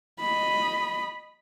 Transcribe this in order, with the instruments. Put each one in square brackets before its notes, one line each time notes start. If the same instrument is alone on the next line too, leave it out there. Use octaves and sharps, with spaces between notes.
[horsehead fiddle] D#5 B5